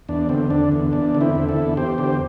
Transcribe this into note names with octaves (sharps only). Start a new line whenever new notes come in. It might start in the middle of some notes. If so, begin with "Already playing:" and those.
E2 D4
D3 C4
D3 D4
E2
E2 D4
D3
C4 E4
D3
E4 A4
E2
E2 G4 C5
D3 G4 C5